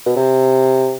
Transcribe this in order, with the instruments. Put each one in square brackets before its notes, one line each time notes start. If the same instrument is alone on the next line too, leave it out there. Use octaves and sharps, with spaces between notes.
[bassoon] B2
C3